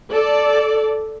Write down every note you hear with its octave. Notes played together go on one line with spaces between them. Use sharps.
A4 D5